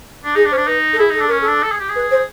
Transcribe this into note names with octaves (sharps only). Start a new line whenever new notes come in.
D4
D#4 G#4
D4
C#4 C5
D4
D#4 B4
A4
E4 G#4
D#4 A4
D4
C#4 A#4
A4
D4
A4
G#4
G4
G#4
B4
C5